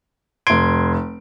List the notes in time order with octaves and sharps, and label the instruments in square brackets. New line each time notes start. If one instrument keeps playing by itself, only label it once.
[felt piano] F1 D7 [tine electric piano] C6 G#6